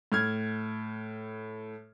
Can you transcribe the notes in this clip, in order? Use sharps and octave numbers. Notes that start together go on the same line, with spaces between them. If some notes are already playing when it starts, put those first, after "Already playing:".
A2 F6 G#6